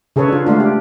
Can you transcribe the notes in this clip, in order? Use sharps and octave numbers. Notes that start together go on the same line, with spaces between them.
C#3 G#4 A4 B4 C#5
D4 F4
G#3 A3 D4 F4
G4